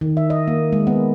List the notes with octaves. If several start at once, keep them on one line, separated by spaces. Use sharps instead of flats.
D#3
E5
D#5
A#3
G#3
B3